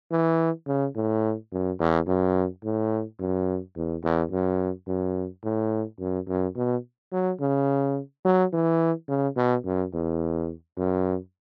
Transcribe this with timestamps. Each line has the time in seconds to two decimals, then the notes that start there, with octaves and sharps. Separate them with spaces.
0.11 E3
0.67 C#3
0.95 A2
1.52 F#2
1.79 E2
2.07 F#2
2.64 A2
3.20 F#2
3.76 E2
4.04 E2
4.31 F#2
4.88 F#2
5.44 A2
6.00 F#2
6.28 F#2
6.56 B2
7.12 F#3
7.40 C#3
8.25 F#3
8.53 E3
9.08 C#3
9.36 B2
9.65 F#2
9.93 E2
10.77 F#2